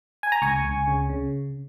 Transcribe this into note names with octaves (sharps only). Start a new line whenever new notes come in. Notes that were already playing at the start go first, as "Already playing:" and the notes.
G#5
A#5
C#2 G#5 C#6
C#2
C#3
C#3